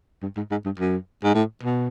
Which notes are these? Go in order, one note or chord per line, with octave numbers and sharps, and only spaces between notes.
G2
G#2
G#2
G2
F#2
G#2
A2
B2